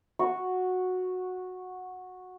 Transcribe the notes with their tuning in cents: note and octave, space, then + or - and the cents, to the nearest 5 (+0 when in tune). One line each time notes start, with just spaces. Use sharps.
F#4 -10 C#6 +0